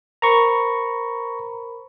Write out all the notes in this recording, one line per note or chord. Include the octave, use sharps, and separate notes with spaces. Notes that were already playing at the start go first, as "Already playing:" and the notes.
A#4 C5 A#5 B5 C#6